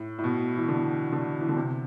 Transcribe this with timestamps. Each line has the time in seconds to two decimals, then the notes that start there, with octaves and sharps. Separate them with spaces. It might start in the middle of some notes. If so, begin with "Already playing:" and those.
Already playing: A2
0.19 A2
0.24 B2
0.57 E3
0.68 D3
1.12 D3
1.41 E3
1.49 D3
1.57 C3